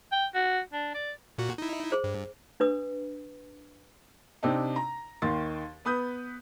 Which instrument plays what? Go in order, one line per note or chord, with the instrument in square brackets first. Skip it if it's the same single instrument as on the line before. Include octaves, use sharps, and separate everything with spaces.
[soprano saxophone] G5
F#4
D4
D5
[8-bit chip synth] A#2 F#4
D#4 E4
[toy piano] G#4 C5
[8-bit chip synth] G2
[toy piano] D4 B4 D#6
[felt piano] C3 C4 D4 D#4
A#5
D#2 D#3 C6 A6
B3 B4 D#6 G6